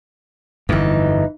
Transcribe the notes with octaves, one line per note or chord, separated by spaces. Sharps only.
G1 F2 E3 D#4